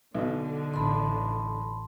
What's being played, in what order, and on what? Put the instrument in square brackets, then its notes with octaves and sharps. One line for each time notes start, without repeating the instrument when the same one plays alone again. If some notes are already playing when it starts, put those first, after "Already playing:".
[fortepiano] B1 B2 [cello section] D3
[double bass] A1 [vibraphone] A5 B5 C6